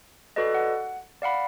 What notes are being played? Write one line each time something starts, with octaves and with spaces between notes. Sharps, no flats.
F#4 A4 B4 D5 D#5
F#5
D5 F5 F#5 B5